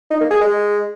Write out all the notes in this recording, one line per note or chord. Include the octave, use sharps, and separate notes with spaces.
D#4
A#3
G#4
G#3